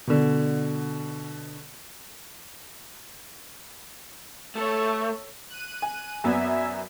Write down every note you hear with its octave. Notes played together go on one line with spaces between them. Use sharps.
B2 D3
A3 A4 C#5
F#6 D#7
G#5
F#2 B3 D5 E5 G#5